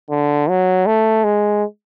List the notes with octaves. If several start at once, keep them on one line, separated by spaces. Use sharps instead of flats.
D3
F#3
A3
G#3